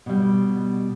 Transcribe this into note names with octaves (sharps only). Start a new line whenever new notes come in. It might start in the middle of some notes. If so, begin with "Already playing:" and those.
B2 G3